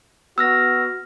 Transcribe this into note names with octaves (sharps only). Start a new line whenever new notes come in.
B3 F#4 E6 F6 A#6